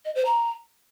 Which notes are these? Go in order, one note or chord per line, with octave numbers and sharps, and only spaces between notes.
D#5
C5
A#5